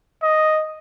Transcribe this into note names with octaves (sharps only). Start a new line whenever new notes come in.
D#5